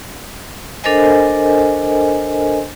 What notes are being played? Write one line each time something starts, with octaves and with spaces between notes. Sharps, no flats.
D4 A4 A#4 C5 D#5 G#5